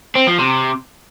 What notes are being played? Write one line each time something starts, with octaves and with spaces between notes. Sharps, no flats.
C4
F3
C3